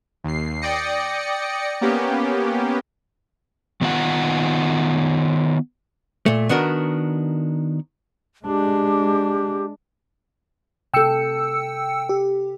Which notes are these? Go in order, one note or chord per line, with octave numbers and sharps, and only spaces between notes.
D#2 C7
D5 G5 D#6 A#6 C#7
A#3 B3 C#4 G4
D#3 B3 D#4 F4 F#5
A#2 A3
D#3 B3 D4 F#4 A#4
G#3 D4 G4
C3 A4 G5 E6 C#7
G4